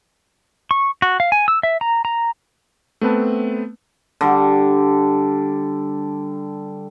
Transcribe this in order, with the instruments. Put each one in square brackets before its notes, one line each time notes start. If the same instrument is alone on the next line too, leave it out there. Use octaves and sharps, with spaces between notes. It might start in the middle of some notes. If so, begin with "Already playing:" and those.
[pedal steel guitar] C#6
F#4
F5
G#5
E6
E5
A#5
A#5
[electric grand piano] A3 B3 C4 B4 A5
[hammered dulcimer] D3 G3